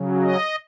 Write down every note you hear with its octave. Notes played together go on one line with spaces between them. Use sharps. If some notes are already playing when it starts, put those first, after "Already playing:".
Already playing: C#3 F#3
D#5